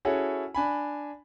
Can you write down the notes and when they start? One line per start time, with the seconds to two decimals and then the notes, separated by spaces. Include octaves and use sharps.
0.05 C#4 E4 F#4 G#4 A4 C#5
0.55 D4 G#5 B5